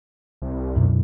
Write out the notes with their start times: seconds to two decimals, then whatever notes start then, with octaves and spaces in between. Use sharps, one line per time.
0.42 C2
0.76 F#2 B2